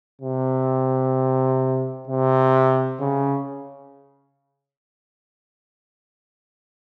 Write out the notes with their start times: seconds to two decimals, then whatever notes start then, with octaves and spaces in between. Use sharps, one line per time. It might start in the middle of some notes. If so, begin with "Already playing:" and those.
0.21 C3
2.07 C3
3.00 C#3